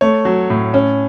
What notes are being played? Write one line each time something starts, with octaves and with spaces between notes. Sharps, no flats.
A3 C#5
F#3
A2
C#4